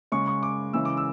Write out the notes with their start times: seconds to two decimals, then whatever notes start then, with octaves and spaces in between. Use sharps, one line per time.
0.12 C#3 G#3 C#6
0.28 C#6
0.43 D6
0.73 C#3 E3 G#3 E6
0.85 D6
0.97 E6